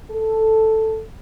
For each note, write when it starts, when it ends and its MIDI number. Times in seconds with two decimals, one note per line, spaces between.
0.11 1.02 69